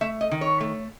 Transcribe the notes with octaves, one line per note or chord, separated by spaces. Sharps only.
A3 E5
D#5
D#3
C#5
A3